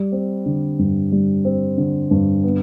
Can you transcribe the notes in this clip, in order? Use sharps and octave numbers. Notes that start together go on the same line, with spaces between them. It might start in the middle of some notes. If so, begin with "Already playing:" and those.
Already playing: G3
C4
D3
G2
G3
C4
D3
G2
B3